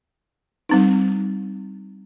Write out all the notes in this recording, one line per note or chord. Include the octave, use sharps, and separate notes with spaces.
G3 C4 D#4